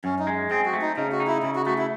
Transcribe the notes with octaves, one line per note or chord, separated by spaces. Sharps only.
F#2 C#4
D#4
G#3
C4 G#4
F#4
A3
D#4
C#3 D#4
F#4
D#4
E4
C#3 E4
F#4
A3 F#4
E4